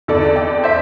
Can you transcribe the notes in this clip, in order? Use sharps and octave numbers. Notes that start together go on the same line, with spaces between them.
E2 D3 A4 D5
D5 G5
C5 E5